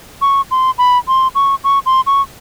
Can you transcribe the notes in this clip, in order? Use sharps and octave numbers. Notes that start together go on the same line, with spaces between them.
C#6
C6
B5
C6
C#6
C#6
C6
C#6